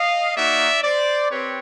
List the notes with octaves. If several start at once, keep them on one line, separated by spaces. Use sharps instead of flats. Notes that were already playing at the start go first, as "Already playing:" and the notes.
Already playing: D#5 F5
A#3 D#4 F#4 D5 E5
C5 D5
C4 G4 B4 C#5